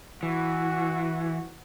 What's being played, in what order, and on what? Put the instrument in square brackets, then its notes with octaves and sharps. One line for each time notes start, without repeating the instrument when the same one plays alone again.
[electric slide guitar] E3 [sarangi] F#4